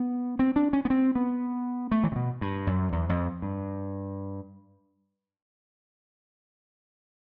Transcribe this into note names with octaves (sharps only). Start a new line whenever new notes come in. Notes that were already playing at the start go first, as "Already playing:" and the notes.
Already playing: B3
C4
D4
C#4
B3
C4
B3
A3
E3
C3
B2
G2
F#2
E2
F2
G2